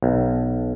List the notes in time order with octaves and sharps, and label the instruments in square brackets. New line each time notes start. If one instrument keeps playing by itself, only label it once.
[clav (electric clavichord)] B1